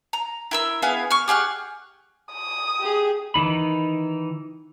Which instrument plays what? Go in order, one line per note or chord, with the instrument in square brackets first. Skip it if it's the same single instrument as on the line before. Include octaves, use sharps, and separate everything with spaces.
[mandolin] A#5
E4 A#4 E6
B3 E4 G#4 F5
C#6 F6
G4 G#4 F#5 F6
[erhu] D#6
[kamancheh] G4 G#4
[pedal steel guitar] D#3 E3 D#4 B5